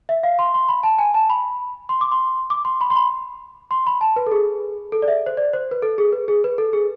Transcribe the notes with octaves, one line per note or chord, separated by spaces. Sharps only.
E5
F5
C6
C6
B5
A5
G#5
A5
B5
C6
D6
C6
D6
C6
B5
C6
B5
C6
B5
A5
B4
A4
G#4
A4
D5
E5
C5
D5
C5
B4
A4
G#4
B4
G#4
B4
A4
G#4